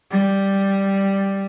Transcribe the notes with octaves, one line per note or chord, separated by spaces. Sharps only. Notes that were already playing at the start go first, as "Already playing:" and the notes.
G3